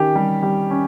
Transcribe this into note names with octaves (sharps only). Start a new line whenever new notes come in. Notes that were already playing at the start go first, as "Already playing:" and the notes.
Already playing: D#3 C#4 G4
G3
G3
C#4